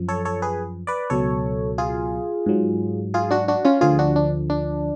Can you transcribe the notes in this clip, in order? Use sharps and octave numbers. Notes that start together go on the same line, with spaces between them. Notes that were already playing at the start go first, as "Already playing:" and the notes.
Already playing: F#2 F3
A4 C#5
A4 C#5
G#4 B4
B4 D5
C#2 B2 F#3 A4 C#5
F4 G#4
G#2 F#3
F4 G#4
D4 F#4
D4 F#4
C#4 F4
D2 D3 F3 F4 G#4
D4 F#4
D4
D4